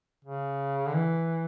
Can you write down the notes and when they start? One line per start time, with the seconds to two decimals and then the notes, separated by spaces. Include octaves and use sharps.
0.25 C#3
0.87 D3
0.94 E3